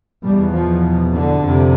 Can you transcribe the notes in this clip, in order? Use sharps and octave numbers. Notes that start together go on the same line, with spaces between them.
E2 B2 G3
F3
D3
F2 C3